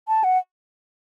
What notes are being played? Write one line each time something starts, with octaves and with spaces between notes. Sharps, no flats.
A5
F#5